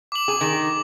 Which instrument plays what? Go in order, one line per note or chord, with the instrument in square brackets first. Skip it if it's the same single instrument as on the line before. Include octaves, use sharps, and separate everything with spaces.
[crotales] D6 F#7
[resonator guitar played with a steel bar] G#4
D#3